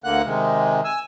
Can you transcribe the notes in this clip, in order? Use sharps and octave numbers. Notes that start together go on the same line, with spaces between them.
D2 D3 A#3 F#5 F#6
C3 D#3 G#3
G#5 E6